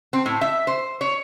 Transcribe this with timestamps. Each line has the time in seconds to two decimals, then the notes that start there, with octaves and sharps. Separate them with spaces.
0.13 C4
0.26 A2
0.41 E5
0.67 C5
1.01 C#5